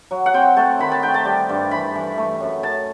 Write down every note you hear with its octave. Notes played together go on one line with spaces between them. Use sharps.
F#3
F#5
C4 G5
A3 A5
D#3 B5
A5
D#3 G5
A5
G3
G2
E3 B5
E3
A3
F#2
F#2 A5